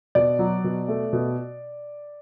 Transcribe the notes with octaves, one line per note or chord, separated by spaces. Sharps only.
B2 D5
F#3
B2
A3
B2